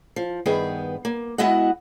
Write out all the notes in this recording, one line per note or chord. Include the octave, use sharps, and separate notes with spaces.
F3
G2 D#3 B3 G#4 G5
A#3
G#3 B3 E4 F#4 D#5 F#5